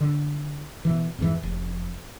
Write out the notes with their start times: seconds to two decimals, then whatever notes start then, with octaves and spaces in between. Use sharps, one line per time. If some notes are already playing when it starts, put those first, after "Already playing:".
0.01 D3
0.85 B2 E3
1.18 F2 G#2 E3
1.43 F1